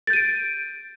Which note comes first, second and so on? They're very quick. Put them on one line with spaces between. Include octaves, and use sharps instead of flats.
A6 G6 D#7 D7